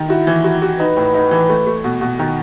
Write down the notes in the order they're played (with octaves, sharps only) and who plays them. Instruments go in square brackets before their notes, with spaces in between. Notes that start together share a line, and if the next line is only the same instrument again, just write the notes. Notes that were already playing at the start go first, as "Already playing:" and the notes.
Already playing: [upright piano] D#3
[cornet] E4 [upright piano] F#4
[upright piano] E3
F#4
F#4
[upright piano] D#4 [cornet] B4
[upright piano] A2
D#4
E3
A3
A3
B2
B2
D#3